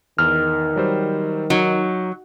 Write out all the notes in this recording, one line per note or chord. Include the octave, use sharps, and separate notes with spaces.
E2 D#3 F6
F#3 G3 C5
F#3 D#4